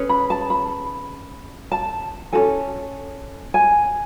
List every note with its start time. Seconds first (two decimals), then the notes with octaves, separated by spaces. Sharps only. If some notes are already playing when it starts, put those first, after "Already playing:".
Already playing: C#4 G#4 B4
0.09 B5
0.30 A5
0.50 B5
1.72 A5
2.33 C#4 F#4 A4 G#5
3.54 G#5